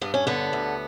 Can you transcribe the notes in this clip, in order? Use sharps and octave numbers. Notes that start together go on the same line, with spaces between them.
G2 B3
C#4
D3 B3
D2